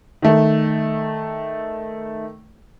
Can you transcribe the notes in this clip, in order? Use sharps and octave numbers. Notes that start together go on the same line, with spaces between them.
D#3 A3